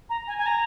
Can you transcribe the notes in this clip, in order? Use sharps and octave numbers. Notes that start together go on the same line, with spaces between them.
A#5
G#5
G#5
A#5